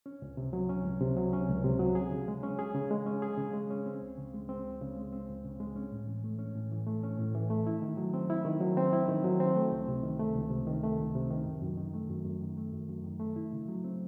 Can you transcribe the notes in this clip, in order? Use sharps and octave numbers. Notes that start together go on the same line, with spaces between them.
C#4
C#2
C3
F#3
C#4
C#2
C3
F#3
C#4
C#2
C3
F#3
G#4
C#3
G#3
C#4
G#4
C#3
G#3
C#4
G#4
C#3
G#3
C#4
C4
C#2
C#3
G#3
C4
C#2
C#3
G#3
C4
C#2
C#3
G#3
C#4
A2
E3
A3
C#4
A2
E3
A3
C#4
A2
E3
A3
E4
D#3
F#3
C4
E4
D#3
F#3
C4
E4
D#3
F#3
C4
A3
C#2
C3
D#3
A3
C#2
C3
D#3
A3
C#2
C3
D#3
F#2
F#2
D#3
A3
F#2
F#2
D#3
A3
F#2
F#2
D#3
A3
E4
C#3
F#3
C4